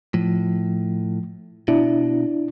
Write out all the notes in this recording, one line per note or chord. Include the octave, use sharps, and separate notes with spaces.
A2 F3
B2 D4 E4